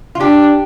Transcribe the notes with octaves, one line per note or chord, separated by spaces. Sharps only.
F4
D4 G4